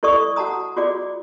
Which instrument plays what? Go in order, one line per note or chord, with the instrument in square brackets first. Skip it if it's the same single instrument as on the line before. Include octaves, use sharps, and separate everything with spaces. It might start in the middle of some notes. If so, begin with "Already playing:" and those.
[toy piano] E4 A4 D5 C#6 D#6
F#4 F#5 A5 A#5 D#6
F4 F#4 G#4 D5 D6